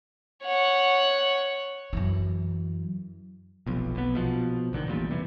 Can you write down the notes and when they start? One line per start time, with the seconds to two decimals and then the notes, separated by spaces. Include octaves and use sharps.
0.44 C#5 F#5
1.93 F#2 E3
3.66 F1 B1 F2
3.95 B1 B3
4.14 A#1 B2 F3
4.73 A1 D3 D#3
4.87 A1 E2 A#2 G3
5.11 C3 E3